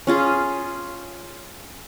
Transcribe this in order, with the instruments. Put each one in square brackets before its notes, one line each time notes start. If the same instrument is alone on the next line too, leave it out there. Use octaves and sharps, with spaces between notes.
[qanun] C#4 F4 G#4